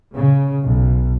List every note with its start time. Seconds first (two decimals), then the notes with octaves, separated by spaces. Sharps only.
0.15 C#3
0.64 B1